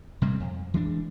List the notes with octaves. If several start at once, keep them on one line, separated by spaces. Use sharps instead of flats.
C3 G3 G#3
F2
E3 G#3 D4